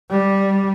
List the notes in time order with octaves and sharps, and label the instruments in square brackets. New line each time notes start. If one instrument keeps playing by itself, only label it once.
[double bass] G3